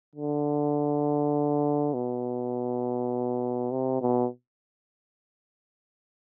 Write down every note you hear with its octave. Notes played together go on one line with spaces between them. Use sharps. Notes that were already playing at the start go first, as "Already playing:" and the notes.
D3
B2
C3
B2